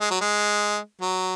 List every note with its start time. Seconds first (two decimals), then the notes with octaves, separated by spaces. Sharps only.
0.01 G#3
0.11 F#3
0.21 G#3
1.01 F#3